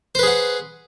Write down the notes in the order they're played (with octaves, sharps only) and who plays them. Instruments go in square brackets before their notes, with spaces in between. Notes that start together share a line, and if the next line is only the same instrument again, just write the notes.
[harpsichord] C5
B4
G#4
F#5